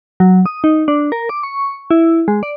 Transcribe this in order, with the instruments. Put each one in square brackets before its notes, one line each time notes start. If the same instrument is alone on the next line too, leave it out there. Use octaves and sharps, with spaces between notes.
[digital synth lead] F#3
D#6
D#4
D4
A#4
D6
C#6
E4
G#3
D5